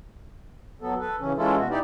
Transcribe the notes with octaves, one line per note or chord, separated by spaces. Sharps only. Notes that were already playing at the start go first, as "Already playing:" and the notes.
F#3 B3 A4
A4 B4
C#3 E3 C#4
E3 G#3 C#4 E4 F4 A4
B2 F#4
D#4 E4 G4 D5